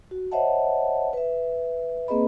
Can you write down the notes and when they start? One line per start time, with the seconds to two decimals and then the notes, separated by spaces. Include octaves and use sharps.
0.11 F#4
0.32 C5 C#5 D#5 E5 F#5 A5
1.13 B4 E5
2.08 A#3 C4 G#4 B4 D#5 B5